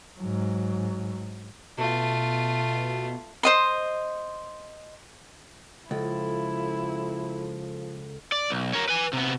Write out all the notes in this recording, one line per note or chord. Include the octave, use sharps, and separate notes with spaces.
G#2 F#3
B2 A3 F4
C5 D#5 C6
C#2 F3 E4 A4
D5
B1
A#4 C#5
B4 G#5
C3 B3